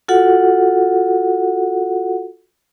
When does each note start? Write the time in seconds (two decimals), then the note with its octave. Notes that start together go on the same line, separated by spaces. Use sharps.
0.08 F4 F#4 A4 F#5